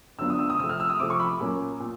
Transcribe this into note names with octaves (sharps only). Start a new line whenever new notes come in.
D3 F#3 B3 D4 F4 E6
D#6
E6
D#6
C3 F3 A3 E6
F6
E6
D#6
C3 F3 A3 D6
C#6
B5
A#2 F#3 A#3 C#4
A#2